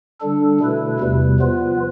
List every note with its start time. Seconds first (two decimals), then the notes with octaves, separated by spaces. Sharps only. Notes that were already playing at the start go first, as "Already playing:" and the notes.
0.20 D3 G3 D4 A4
0.60 B2 A3 E4 B4
0.99 E2 C3 G3
1.39 F3 B3 F4 B4